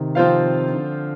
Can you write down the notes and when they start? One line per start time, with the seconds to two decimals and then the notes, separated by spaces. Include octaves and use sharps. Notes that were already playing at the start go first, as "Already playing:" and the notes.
Already playing: C3 D#3
0.15 F3 C4 F4 C5 F5
0.70 D3